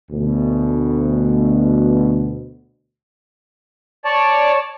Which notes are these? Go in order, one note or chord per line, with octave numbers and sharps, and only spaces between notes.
D2 B2
C#5 D5 A5